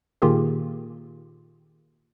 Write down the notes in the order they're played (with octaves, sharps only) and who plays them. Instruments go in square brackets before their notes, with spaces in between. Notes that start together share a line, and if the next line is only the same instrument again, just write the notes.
[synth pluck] A#2 D#3 A#3 F4 G4 G#4